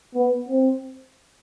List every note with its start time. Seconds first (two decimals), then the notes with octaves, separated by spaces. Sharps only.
0.14 B3
0.49 C4